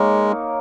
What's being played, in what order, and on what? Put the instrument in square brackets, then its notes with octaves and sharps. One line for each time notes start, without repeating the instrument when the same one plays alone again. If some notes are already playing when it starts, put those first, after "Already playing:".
Already playing: [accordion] G#3 [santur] A#3 D#4 A#4 C#5